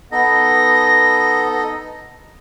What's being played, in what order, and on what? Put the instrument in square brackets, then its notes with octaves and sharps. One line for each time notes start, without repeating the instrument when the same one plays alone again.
[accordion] B3 [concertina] D#4 A4 D#5 [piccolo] A#6